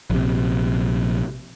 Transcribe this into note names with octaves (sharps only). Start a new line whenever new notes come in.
A#1 C3